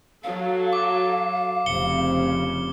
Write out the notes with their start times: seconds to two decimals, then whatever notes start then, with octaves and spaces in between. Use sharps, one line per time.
0.23 F#3 A4 F5
0.73 D6
1.66 F1 C#3 C4 C#7 G7